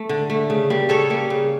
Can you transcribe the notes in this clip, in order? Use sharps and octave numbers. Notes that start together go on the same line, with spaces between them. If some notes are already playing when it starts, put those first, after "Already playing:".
Already playing: A3
D3
A3
C#3
G3 A#3
C#3 A4 C#5
G3 A#3
C#3